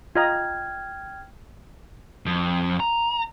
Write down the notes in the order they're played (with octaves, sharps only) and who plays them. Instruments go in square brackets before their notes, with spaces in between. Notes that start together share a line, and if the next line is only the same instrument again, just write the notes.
[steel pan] F4 D#5 A#5 [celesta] G5 F6 G#6
[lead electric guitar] F2
A#5